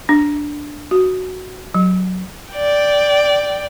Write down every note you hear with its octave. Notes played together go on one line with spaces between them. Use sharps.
D4
F#4
F#3
D5 G5